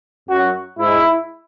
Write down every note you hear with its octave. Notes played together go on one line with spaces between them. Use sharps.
F#2 F#3 F#4
G#2 G#3 E4